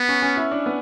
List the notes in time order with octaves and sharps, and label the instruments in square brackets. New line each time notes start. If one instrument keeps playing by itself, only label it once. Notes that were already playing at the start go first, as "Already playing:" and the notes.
Already playing: [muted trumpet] B3
[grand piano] C#4
C#4
E4
D4
B3